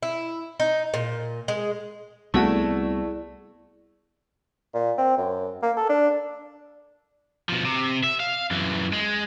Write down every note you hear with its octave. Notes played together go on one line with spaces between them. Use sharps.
E4
D#4
A#2
G#3
C2 A3 B3 E4 F#4 G#4 D5 A5
A#2
C4
F#2
A#3
A4
D4
B2 F3
C3
E5
F5
F#2 E3
G#3